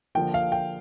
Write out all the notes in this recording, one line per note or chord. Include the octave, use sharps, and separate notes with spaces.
D3 F3 A#3 G5
F5
G5